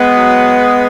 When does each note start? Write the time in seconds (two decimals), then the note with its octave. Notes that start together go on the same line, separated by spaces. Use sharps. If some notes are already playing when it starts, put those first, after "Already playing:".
Already playing: G#3 B3
0.15 F#3